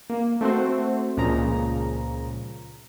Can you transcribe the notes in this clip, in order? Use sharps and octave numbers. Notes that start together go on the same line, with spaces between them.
A#3
A3 C4 F#4 C5
C#2 A#2 C#3 F3 A#5